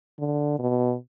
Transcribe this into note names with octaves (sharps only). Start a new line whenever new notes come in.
D3
B2